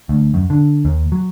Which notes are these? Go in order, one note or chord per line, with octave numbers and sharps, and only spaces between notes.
D2
F#2
D3
D#2
F#3